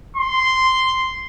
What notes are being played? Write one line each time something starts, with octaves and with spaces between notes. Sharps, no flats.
C6